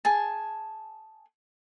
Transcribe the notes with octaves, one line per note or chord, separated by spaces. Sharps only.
G#4 G#5 A5